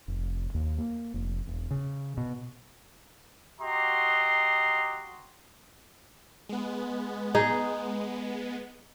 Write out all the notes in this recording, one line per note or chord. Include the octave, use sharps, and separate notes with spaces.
F1
D#2
A#3
F1
E1
C#3
B2
F#4 G4 D#5 A#5 C6
G#3 B3
D#4 G#4